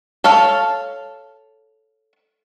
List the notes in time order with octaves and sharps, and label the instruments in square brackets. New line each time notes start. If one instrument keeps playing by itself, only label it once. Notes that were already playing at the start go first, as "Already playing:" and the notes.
[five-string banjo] A4 C#5 F5 A5